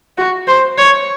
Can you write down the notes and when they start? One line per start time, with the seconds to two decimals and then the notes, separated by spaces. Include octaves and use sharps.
0.18 F#4
0.48 C5
0.78 C#5